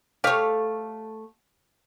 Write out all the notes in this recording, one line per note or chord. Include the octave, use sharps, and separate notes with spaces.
A3 G4 C#5 F5